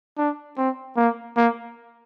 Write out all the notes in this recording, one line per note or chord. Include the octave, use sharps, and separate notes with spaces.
D4
C4
A#3
A#3